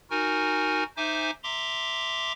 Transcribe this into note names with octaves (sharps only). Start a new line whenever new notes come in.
D#4 F#4 A#4 G#5
D#4 C5 E5 G#5 D6
E5 A#5 C6 D6